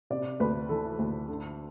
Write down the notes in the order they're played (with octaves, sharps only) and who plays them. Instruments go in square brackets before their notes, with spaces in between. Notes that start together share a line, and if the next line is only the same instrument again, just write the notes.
[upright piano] C3 D5
D2 B4
E3 A4
D2
D3